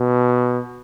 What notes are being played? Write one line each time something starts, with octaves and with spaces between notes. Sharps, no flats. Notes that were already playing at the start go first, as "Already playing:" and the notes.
Already playing: B2